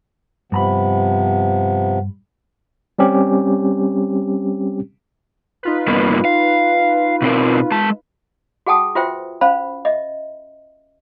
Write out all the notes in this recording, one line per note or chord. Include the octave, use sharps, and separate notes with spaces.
G2 C3 F3 B3 A#5 B5
G3 C4 C#4 G4
D#4 F4 B4
G2 A#3 B3
F5
B2 C4 A#4
G#3 A5
F#4 G#4 F#5 G5 A5 D#6
F4 F#4 B4 C5 E5 G5
C#4 C5 F5 B5
D#5 E5